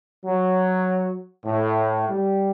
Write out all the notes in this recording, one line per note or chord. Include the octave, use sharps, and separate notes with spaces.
F#3
A2
G3